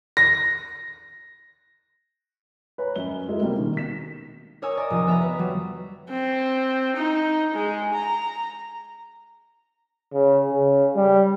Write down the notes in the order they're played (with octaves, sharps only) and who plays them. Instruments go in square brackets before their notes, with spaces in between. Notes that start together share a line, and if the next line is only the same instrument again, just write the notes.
[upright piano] A#6
[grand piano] B4 C#5 G#5 A#5
F#2 G7
G#3 E4 F#4 A4 A#4 D#5
C3 G3 A#3 C4
B2 D#3 A#3
B6 E7
[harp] A#4 C#5 G#5 D#6 E6
D5 D#5 G#5 A#5
F1 F3 D#6
B3 E5 A#5
B4
F#3 G3
[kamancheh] C4
D#4
G#3
A#5
[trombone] C#3
C#3
G3